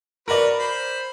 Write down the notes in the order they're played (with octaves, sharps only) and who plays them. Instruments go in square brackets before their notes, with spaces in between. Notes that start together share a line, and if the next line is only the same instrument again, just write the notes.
[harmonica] F#4 B4 [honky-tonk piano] A#4 D5
[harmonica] C5 B5